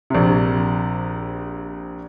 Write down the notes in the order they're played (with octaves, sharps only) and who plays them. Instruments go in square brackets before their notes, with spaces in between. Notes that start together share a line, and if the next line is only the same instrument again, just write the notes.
[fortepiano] A#1 C3